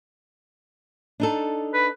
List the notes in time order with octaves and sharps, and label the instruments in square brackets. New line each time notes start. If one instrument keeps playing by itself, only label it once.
[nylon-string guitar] D4 D#4 A4
[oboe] B4